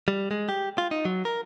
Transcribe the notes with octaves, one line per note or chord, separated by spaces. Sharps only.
G3
G#3
G4
F4
D#4
F#3
A#4